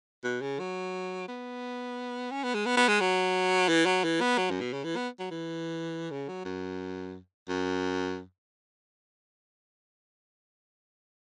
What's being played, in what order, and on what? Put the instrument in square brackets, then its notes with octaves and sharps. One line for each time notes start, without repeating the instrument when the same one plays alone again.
[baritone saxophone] B2
C#3
F#3
B3
C#4
B3
G#3
B3
B3
G#3
F#3
E3
F#3
E3
B3
F#3
F#2
B2
C#3
E3
B3
F#3
E3
C#3
F#3
F#2
F#2